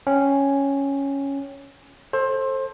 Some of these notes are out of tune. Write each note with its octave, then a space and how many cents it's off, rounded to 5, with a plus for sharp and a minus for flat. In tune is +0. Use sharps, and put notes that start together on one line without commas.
C#4 +0 G5 +0
A4 +0 C5 +25